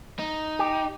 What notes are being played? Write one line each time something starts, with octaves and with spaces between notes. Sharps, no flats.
D#4
G4